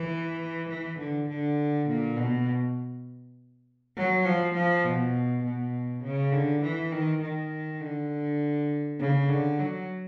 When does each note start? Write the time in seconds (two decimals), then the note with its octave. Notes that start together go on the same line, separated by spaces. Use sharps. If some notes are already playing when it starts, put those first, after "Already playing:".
Already playing: E3
0.69 E3
0.99 D3
1.29 D3
1.88 A#2
2.17 B2
3.96 F#3
4.25 F3
4.55 F3
4.84 B2
5.43 B2
6.03 C#3
6.32 D3
6.62 E3
6.92 D#3
7.22 D#3
7.81 D3
9.00 C#3
9.28 D3
9.59 F#3